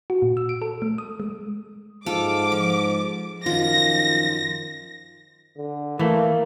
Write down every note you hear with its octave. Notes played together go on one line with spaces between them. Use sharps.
F#4
A#2
E6
D7
A4
A3
D#6
G#3
G#2 F4 A4 D6
F3
F#2 D#3 F3 F4 A#6
D3
E3 A3 A#3